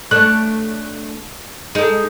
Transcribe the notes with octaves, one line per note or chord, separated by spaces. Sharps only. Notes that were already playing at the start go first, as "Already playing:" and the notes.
A3 D4 C#5 F#6
G#3 D#4 A4